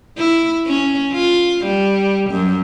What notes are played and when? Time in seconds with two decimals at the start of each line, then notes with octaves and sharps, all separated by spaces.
0.17 E4
0.67 C#4
1.12 F4
1.65 G3
2.31 F#2